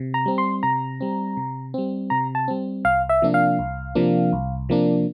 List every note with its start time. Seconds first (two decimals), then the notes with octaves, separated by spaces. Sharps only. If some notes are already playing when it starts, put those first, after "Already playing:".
Already playing: C3
0.14 A#5
0.26 G3 C4
0.38 C6
0.63 C3 A#5
1.01 G3 C4
1.37 C3
1.74 G3 C4
2.10 C3 A#5
2.35 A5
2.48 G3 C4
2.85 C2 F5
3.09 E5
3.22 C3 F3 A#3 D4
3.34 F5
3.59 C2
3.95 C3 F3 A#3 D4
4.33 C2
4.69 C3 F3 A#3 D4